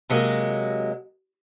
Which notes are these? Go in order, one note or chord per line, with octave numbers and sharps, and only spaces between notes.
C3 F#3 G#3 A#3